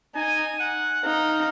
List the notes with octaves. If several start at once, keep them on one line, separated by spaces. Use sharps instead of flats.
D#4 G#5
F#5
D#4 F5